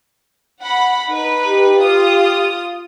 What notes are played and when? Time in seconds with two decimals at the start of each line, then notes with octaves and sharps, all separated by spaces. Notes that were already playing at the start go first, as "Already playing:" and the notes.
0.61 F#5 B5
1.11 D#4 B4
1.45 G4
1.80 F4 D#6